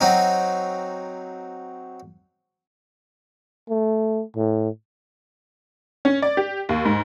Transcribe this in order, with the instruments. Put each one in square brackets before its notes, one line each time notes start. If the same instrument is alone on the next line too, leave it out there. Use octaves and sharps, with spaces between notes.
[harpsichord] F#3 C4 D#4
[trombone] A3
A2
[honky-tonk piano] C#4
D5
G4
D#2
G#2